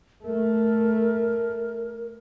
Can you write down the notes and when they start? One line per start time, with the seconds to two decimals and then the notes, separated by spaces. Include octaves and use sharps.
0.24 A3 A#4